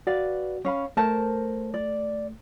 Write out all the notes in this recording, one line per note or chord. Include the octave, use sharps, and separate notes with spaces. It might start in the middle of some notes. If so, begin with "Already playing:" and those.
F#4 B4 D5 F5
C#4 F5 B5
A3 A#4 C5 A5
D5